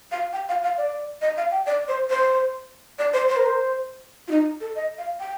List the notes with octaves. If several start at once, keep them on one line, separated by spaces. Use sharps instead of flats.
F5
G5
F5
F5
D5
D#5
F5
G5
D5
C5
C5
D5
C5
C5
A#4
C5
F4
D#4
A4
D#5
F5
G5